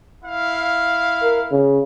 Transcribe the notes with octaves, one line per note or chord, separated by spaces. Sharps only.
E4 F5
A#4
C#3